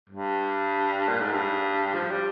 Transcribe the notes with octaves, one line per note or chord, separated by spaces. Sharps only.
G2
A#2
G#2
G2
F3
G3